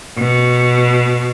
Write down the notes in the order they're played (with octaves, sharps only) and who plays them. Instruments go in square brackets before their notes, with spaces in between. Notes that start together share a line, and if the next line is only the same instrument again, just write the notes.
[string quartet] B2